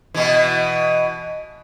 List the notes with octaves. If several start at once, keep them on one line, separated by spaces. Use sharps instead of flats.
B2 E3